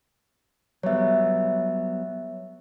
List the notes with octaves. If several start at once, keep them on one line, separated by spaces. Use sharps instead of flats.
F#3 G3 B3 C#5 E5